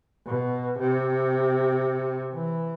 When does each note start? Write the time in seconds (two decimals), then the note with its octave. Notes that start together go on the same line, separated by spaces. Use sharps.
0.27 B2
0.79 C3
2.33 E3